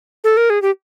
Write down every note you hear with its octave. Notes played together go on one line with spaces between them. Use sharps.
A4
A#4
G#4
G4